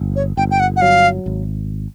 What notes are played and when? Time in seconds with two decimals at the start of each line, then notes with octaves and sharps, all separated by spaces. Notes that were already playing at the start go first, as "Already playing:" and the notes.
Already playing: G1
0.16 C#5
0.37 G1 G5
0.51 G5
0.60 F#5
0.76 F#5
0.81 F#3 F5
1.26 G#1